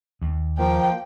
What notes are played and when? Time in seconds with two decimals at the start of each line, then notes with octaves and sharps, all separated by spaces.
0.22 D#2
0.58 F3 A#3 G5